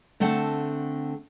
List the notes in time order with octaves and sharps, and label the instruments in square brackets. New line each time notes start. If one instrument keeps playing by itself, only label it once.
[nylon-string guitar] D3 A3 C4 A4 F#5 A5